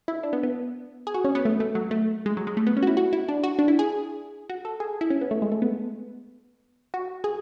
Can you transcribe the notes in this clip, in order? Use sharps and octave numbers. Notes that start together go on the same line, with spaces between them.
E4
D4
B3
B3
G#4
F#4
C#4
B3
A3
A3
F#3
A3
G#3
F#3
G#3
A3
B3
C#4
F#4
E4
F#4
E4
D4
F#4
D4
E4
G#4
F#4
A4
G#4
E4
C#4
B3
A3
G#3
A3
B3
F#4
G#4